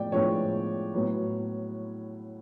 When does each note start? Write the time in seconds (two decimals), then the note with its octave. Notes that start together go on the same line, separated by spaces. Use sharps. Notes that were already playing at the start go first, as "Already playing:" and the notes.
Already playing: A2 F3 G#3 B3 D5 G5
0.12 A2 F3 G#3 B3 D4 C#5
0.94 A2 F#3 B3